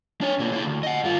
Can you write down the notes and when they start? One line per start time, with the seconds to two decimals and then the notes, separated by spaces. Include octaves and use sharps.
0.21 D4 C#5
0.39 B2 A#3
0.52 A#3 E4
0.64 D2
0.83 D#5 F#5
1.04 G2 F4